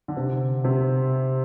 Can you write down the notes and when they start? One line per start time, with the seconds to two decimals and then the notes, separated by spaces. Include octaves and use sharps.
0.08 D3
0.16 C3
0.64 C3